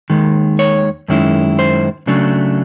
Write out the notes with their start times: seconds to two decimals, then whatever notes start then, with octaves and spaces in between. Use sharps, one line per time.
0.10 D#2 D#3 G#3
0.59 C#5
1.08 F#2 D#3 G#3 C#4 E4
1.59 C5
2.07 C#3 F#3 A3 D4